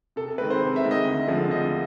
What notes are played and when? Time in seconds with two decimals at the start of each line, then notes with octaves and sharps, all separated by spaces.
0.16 C3 A4
0.28 A4
0.38 D#3 G#3 C4 B4
0.50 C5
0.60 C3
0.76 E5
0.83 D#3 G#3 C4
0.91 D#5
1.06 D2
1.27 D3 F3 G#3 C4
1.50 D2 D#5